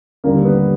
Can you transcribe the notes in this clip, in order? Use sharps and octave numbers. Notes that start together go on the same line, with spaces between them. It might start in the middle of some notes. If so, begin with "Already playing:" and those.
D#2 D3 G3 A#3
B3